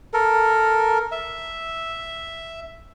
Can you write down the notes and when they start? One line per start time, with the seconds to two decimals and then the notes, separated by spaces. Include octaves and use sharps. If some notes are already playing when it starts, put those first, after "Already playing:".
0.13 A4 A#4
1.12 E5